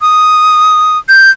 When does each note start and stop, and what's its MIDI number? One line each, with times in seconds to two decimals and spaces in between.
0.01 0.98 87
1.09 1.30 91